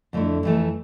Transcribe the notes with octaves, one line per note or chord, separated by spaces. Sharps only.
F2 D3 A3 E4
F2 E3 A3